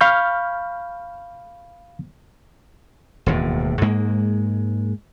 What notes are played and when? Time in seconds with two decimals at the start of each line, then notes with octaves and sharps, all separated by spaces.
0.01 F5 B5 C#6 F6 G6
3.26 E1 D#2 A2
3.82 G#2 G#3 A#3